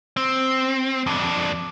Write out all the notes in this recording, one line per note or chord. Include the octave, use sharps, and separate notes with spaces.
C4
F2 D4